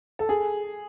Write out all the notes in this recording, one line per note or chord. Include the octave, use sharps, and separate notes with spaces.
A4
G#4